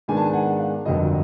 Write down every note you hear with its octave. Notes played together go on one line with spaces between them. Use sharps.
G#2 D#3 G#3 B3 D4 G#5
A5
G#5
F#5
F5
G1 F2 D3 F#3 A#3 D#5